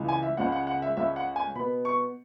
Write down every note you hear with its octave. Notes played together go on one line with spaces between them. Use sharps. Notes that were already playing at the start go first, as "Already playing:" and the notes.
Already playing: C#2 C#3 E3 G#3
G#5
E5
C#2 C#3 G#3 C#4 F#5
F#5
F#5
E5
C#2 C#3 G#3 C#4 E5
F#5
G#5
B2 B3 B5
C#6